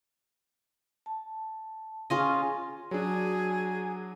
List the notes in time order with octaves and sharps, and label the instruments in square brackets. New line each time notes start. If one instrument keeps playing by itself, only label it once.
[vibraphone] A5
[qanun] C#4 F4 D#5 [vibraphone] G#4
[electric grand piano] F#3 D4 [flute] G#4